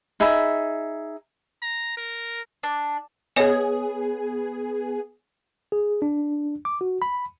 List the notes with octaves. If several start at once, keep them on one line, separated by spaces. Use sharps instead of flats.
D#4 G#4 E5 B5
A#5
A#4
D4
B3 G#4 C#5 D#5 G#5
G#4
D4
D6
F#4
B5